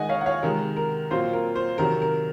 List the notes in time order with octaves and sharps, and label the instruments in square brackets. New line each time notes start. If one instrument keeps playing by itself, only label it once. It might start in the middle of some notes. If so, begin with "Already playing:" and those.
Already playing: [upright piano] D#3 G#3 D#4 D#5 F#5 G#5
C#5 F5
F#5
C#5 F5
C3 D#3 G#3 A#4
A#4
A#2 F#3 C4 F4 C5
A#4
C5
C3 D#3 F#3 A#4
A#4